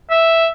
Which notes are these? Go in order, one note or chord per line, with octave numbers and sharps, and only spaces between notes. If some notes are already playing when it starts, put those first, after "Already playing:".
E5